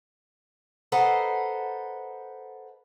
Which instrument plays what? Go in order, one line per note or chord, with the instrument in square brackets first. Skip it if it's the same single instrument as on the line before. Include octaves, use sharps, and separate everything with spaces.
[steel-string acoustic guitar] A4 B4 C5 D#5 F#5 A#5